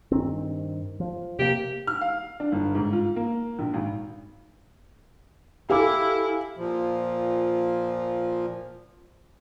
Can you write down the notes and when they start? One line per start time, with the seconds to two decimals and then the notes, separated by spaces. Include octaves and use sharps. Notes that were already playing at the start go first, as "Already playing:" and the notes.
0.12 G2 D#3 C4
1.00 F3
1.39 C3 A#3 G4
1.87 F6
2.01 F5
2.40 D4
2.52 G1
2.75 G#2
2.93 F4
3.16 A#3
3.59 A#1
3.74 G#1
5.70 E4 G4 A4 F5 G#5 D6
6.57 A#2 F3